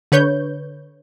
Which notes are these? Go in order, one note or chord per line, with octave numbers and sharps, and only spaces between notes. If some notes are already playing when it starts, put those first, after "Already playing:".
D3 B4 C#5 G6